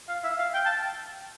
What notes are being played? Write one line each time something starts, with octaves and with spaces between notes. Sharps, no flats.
F5
E5
F5
G5
A5